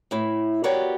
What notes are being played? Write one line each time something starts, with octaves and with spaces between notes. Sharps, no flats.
A2 E4
B3 F#4 G4 A#4 C#5 D5